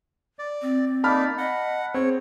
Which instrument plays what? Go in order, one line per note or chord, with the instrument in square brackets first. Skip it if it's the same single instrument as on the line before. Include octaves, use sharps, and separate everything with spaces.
[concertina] D5
[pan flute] C4
[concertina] A#3 D#4 D5 [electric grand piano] A5 B5 F6
[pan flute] D#5 [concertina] F#5
[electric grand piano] C4 [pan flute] G#4 [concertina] C#5